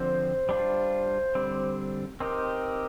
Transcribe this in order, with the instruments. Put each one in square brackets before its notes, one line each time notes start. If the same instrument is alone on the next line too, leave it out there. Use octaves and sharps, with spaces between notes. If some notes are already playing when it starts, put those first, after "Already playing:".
Already playing: [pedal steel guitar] D3 F3 C4 [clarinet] C5
[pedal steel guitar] G3 D4 F4
D3 G3 C4
[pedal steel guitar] C4 D#4 G4 [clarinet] A#4